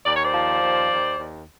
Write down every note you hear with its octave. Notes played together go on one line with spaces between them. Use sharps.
D#2 D5
C#5
C5 D5
F3
D#2
D#2
D#2